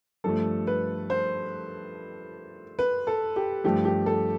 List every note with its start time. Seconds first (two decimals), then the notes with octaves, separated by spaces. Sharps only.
0.24 G2 F3 A3 A4
0.67 B4
1.10 C5
2.79 B4
3.07 A4
3.36 G4
3.64 G2 F3 A3 G4
3.85 G4
4.06 A4